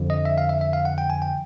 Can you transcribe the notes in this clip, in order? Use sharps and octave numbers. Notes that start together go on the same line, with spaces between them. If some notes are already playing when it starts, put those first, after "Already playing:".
Already playing: F2 D3 F3
D#5
E5
F5
E5
E5
F5
F#5
G5
G#5
G5